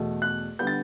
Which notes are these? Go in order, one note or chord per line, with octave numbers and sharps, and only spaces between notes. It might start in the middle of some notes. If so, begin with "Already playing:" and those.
Already playing: E2 B2 A3
F#6
D3 G3 B3 G6
A6